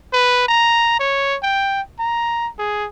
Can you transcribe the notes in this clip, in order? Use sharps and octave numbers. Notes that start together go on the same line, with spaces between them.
B4
A#5
C#5
G5
A#5
G#4